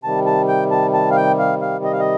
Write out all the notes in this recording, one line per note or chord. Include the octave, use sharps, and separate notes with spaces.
C3 D#3 G3 A5
A5
G5
A5
A5
F5
G5
F5
F5
D#5
F5
D#5